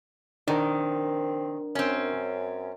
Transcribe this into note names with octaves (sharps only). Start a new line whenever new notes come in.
D#3 C4 D4 A#4
F#2 C4 C#4